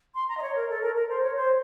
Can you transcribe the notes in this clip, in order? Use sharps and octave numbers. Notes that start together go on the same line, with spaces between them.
C6
A#5
D#5
C#5
A#4
A4
A#4
A#4
C5
C#5
C5